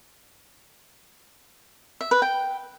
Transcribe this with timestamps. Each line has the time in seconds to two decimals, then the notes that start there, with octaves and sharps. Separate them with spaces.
2.01 E5
2.11 B4
2.22 G5